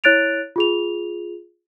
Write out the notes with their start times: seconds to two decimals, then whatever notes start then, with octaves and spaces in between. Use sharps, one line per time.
0.04 E4 C#5 F#6 A6 D7 F7
0.56 F4 G#4 F7